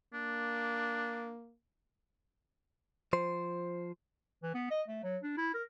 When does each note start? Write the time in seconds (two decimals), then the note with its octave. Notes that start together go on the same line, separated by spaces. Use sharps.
0.14 A#3 D4
3.13 F3 C5
4.43 E3
4.54 B3
4.71 D#5
4.88 A3
5.04 F#3
5.23 D4
5.37 E4
5.54 A#4